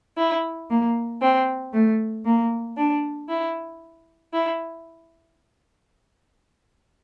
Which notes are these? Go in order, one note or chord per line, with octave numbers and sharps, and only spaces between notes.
E4
A#3
C4
A3
A#3
D4
E4
E4